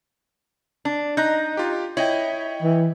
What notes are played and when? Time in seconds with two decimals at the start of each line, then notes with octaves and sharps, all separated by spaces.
0.85 D4
1.17 D#4 A#5 F#6 G6
1.57 F4 G4
1.97 E4 C#5 D#5 G5
2.62 E3